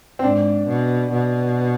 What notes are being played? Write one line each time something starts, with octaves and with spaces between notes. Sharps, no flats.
C4
G#2 D4
B2
B2